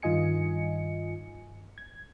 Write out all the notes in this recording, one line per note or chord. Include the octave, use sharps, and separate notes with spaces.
G2 D#3 F4 D#5 G#5 C#7
G#6